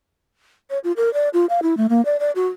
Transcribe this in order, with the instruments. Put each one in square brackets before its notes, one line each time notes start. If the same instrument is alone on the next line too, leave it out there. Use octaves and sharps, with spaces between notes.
[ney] C#5
F4
A#4
D5
F4
F5
E4
A3
A#3
D5
D5
F#4